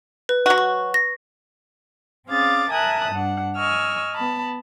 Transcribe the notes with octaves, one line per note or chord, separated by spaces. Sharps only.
B4
F#3 F#4
C#6
A#6
C4 C#4 G#4 F5 D6 A6
A#4 E5 G#5 A5 D#6 F#6
G2 D4 F#5
D#5 G#5 C#6 E6 F6
B3 A5 B5